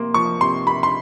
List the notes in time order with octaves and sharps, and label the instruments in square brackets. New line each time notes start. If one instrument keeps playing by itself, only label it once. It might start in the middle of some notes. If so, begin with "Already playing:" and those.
Already playing: [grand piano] C3 F3 A#3 C6
F3 C#6
C3 C6
C3 B5
C6